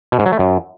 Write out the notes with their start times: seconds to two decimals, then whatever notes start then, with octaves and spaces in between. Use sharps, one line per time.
0.12 B2
0.19 G#2
0.26 F#3
0.32 A3
0.39 F#2